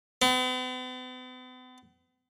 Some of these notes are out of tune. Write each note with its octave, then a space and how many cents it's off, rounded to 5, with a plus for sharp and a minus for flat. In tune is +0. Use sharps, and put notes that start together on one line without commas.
B3 +45